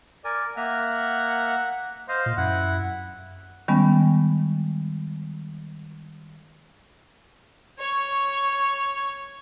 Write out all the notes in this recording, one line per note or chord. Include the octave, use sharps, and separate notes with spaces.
A#4 D5 G#5
A#3 E5 F#5 A#5
C5 D#5 F5
A#2
F#2 E4 F#5
D#3 G3 G#3 B3 C#4
C#5 C#6